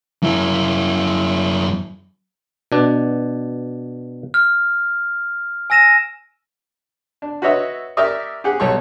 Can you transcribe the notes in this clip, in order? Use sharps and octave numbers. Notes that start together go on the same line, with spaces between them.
F#2 E4
B2 D4
F6
G#5 E6 A#6 D#7 E7
D4
F#4 B4 C#5 D#5 E5
G4 A#4 D5 E5 C#6 D#6
G4 G#4 F#5
B1 G3 A4 C#5 C#6